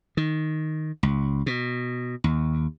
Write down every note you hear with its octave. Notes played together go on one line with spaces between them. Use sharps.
D#3
C#2
B2
D#2